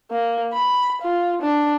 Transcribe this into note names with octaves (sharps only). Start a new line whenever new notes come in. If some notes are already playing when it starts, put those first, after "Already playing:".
A#3
B5
F4
D4